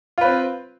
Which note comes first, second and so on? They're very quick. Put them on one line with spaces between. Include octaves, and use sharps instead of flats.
F4 B4 C4